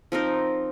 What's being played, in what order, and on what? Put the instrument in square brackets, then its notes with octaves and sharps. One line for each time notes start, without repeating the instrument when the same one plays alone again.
[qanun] F3 C4 D#4 A#4